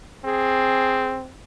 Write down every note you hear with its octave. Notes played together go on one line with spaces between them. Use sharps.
C4 G#4